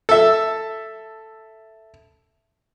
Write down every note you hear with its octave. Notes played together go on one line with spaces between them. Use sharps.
A4 E5